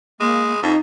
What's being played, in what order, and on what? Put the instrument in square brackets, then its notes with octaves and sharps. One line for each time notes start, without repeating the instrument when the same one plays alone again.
[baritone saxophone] G#3 [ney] A#3
[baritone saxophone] F2 [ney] D#4